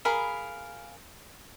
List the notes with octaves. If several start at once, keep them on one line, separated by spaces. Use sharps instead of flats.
G#4 A#4 F5 B5